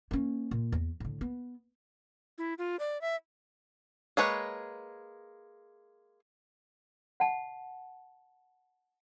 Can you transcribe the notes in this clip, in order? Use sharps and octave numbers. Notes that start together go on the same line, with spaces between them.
A#3 C#4
A#2
E2
A2 D3
B3
E4
F4
D5
E5
G#3 A#3 B4 C#5
F#5 A5